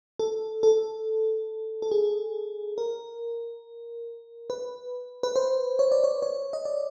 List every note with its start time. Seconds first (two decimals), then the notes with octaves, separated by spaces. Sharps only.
0.19 A4
0.63 A4
1.82 A4
1.91 G#4
2.78 A#4
4.50 B4
5.23 B4
5.36 C5
5.79 C#5
5.92 D5
6.04 C#5
6.22 C#5
6.53 D#5
6.65 D5